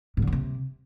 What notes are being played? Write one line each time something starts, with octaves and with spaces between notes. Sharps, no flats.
A2
D3
F#2
C3